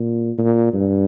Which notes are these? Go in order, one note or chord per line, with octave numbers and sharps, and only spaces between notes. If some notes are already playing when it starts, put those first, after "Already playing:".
Already playing: A#2
A#2
G2